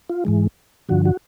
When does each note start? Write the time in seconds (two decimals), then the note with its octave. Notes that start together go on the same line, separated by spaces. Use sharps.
0.10 F4
0.25 G#2 E3 G#3
0.89 G2 D3 F3 F#4
1.05 F#4